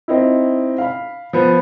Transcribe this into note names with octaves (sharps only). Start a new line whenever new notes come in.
C4 D#4 E4
F5 B5
F3 B3